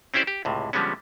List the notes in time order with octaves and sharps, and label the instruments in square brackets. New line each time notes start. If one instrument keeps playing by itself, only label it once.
[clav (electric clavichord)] C4 C#4 E4 G4 C5 D5
G4
C#2 A2 C3
D3 F3 G3 G#3 B3 C#4